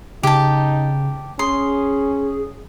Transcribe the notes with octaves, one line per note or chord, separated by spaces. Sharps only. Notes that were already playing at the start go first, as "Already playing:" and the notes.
C#3 D#4 G4 A5
C#4 G#4 C6